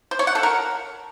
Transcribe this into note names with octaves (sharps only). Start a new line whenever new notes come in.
C5
C#5
F#5
A4
A#4